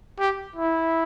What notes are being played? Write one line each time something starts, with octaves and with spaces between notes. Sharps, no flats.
G4
E4